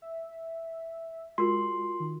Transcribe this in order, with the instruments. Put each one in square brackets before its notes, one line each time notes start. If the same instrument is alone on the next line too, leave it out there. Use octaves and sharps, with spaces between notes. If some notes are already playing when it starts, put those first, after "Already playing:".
[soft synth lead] E5
[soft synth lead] G#3 [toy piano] F4 F#4 A#4 [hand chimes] C6
[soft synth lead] D#3